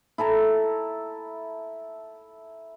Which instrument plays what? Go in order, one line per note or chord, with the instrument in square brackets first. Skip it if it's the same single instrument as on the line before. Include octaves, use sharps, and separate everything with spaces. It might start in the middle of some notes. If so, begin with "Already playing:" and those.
[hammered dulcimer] E4 A4 E5 A#5